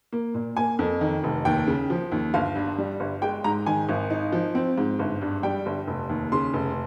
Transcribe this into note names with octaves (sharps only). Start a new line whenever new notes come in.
A#3
A#2
A#3 G#5
F2
D#3
F1
D#2 G5
C#3
F3
D#2
G1 F5
G2
G3
G1
G#3 G5
G#2 A#5
D#3 G#5
G#1
D#4
F3
C4
G#2
G1
G2
G3 G5
G1
F1
D#2
C#3 C6
F1